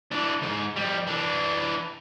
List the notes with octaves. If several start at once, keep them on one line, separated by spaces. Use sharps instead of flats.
E3 D4
D2 G#2
F2 G3
E3 D4